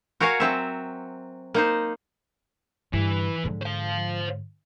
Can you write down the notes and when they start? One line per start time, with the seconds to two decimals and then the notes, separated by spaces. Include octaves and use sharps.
0.20 F#4 A#4 C#5 F5 G#5
0.40 F#3 C4 E5
1.54 A#3 D#4 C5
2.93 G2 D3 E3
3.44 G#2 D3
3.61 C5 F5